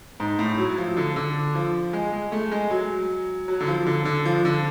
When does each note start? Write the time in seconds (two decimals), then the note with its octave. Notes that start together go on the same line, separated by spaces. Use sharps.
0.20 G#2
0.39 A2
0.58 F#3
0.69 F#3
0.78 F3
0.97 D3
1.16 D3
1.55 F3
1.93 G#3
2.13 G#3
2.32 A3
2.52 G#3
2.70 F#3
3.48 F#3
3.60 D3
3.67 F3
3.87 D3
4.05 D3
4.25 F3
4.45 D3